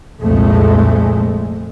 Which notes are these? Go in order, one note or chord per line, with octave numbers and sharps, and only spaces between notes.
C2 F2 A#2 G#3 A3